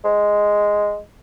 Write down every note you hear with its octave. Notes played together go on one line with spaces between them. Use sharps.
G#3